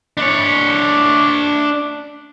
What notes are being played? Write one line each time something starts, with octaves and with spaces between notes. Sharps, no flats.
D4 C#5